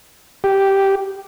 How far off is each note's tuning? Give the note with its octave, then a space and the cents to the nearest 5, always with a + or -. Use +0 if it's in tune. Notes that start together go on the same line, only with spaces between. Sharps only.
G4 -5